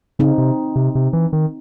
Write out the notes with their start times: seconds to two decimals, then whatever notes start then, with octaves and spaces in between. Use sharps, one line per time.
0.19 C#3 C4 D#4
0.38 C3
0.76 C3
0.95 C3
1.13 E3
1.33 D#3